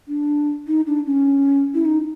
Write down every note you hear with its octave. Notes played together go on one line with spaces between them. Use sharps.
D4
D#4
D4
C#4
E4
D#4